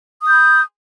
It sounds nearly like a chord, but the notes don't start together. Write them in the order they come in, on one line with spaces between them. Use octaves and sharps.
D#6 G6 B5